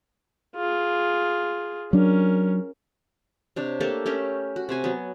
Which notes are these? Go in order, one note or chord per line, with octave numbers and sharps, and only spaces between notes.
F4 G#4
F#3 C#4 D4 A#4
C3 D4 C#5
A3 A#3 G4 A4
A3 C#4 G4 A#4
F#4
C3 C5 G#5
F#3 B3